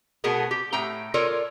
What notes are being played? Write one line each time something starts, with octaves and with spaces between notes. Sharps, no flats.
B2 A3 B3 F#4 G#4 A#4
G4
A2 A3 G5 A#5
F4 A4 A#4 C#5 D5